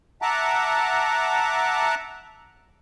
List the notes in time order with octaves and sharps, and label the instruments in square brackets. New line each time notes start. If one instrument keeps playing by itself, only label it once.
[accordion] E5 F#5 A5 A#5 D6